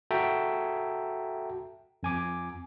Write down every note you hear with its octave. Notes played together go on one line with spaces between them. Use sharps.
F#4 A4 E5 G5 A5 A#5
F2 G#5 D6